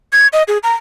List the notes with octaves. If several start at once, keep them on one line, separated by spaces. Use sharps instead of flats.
G#6
D#5
G#4
A#5